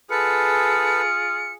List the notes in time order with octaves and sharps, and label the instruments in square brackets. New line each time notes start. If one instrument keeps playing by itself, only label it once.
[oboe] F4 [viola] G#4 [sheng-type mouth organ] A4 B4 [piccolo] C#7